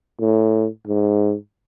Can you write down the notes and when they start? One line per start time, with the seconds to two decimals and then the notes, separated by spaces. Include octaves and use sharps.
0.20 A2
0.87 G#2